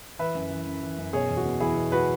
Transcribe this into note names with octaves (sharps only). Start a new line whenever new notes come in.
E3 B4 E5
F#2
E3
F#2
E3
F#2
B2 G#4 C#5
E2
F#4
B2
E2 E4 G#4
B2
F#4 B4